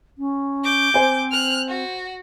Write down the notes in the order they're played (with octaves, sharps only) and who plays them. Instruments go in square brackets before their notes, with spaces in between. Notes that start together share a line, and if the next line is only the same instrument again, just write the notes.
[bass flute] C#4
[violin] D6 G6
[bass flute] C4 [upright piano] C5 G#5
[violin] F6 F#6
F#4